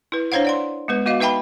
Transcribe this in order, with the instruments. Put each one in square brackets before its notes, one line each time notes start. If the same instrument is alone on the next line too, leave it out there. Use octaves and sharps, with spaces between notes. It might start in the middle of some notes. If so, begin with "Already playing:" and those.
[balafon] E4 B4
D4 C5 C#5 F5 F#5
D5 F#5 C6
G#3 B3 B4
B3 F#4 D#5 F5
D#4 B4 E5 G5 A5 B5